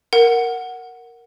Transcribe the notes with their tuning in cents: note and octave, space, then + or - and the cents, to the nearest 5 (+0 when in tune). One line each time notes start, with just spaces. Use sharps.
A#4 +0 F#5 +0